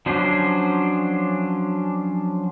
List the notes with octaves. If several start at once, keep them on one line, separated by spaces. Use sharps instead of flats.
F3 F#3 C#4 D4 C5